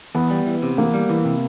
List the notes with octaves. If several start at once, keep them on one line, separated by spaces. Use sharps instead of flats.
E2 B3
G3
E3
C3
E2 A#3
G3
E3
C3